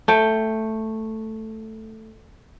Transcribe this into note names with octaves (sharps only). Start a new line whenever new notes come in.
A3 G5